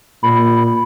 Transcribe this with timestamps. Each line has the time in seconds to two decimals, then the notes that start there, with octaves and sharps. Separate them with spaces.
0.23 A#2 B5